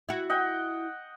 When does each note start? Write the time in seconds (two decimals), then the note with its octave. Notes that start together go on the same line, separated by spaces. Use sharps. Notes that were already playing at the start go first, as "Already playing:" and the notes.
0.09 E4 F#4
0.30 D#5 F#5 G5